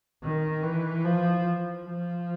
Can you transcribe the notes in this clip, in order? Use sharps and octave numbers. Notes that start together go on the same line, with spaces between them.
D#3
E3
F3
F3